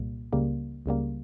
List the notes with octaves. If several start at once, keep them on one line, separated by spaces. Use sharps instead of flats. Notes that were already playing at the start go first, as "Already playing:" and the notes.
Already playing: C2 A#2 G3 A#3
C#2 C#3 G3 A#3
C#2 C#3 G3 A#3